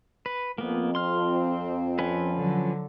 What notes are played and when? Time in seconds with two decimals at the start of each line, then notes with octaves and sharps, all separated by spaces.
0.26 B4
0.58 F2 A#3 B3
0.95 C4 C6 F6
1.99 F3 C#4 B4
2.36 D3 F#3